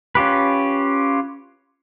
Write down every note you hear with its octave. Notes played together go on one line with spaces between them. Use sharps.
C#4 F4 G4 B4